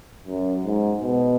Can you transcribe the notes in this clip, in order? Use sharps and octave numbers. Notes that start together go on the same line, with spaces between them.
F#2
G#2
B2